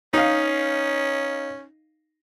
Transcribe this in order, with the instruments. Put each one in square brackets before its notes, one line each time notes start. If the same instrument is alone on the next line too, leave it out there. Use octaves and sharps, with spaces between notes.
[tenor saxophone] C#4 [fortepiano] D#4 F5